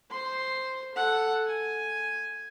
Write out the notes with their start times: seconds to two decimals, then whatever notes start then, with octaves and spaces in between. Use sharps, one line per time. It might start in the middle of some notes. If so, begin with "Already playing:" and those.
0.10 C5 C6
0.95 A4 F#5
1.46 G#5